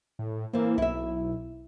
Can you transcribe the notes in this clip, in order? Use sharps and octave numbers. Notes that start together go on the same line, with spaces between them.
A2
E3 A#3 C4
B1 E4 E5